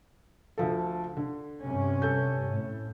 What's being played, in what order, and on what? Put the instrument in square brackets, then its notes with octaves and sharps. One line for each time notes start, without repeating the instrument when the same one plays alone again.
[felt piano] D2 F3 A4
D3
[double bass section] G2 C3 C#4
[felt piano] A4 G6
[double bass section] A2